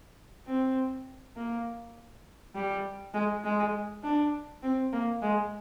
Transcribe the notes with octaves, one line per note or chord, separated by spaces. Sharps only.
C4
A#3
G3
G#3
G#3
D4
C4
A#3
G#3